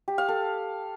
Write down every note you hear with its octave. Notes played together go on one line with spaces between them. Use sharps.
G4
F5
A4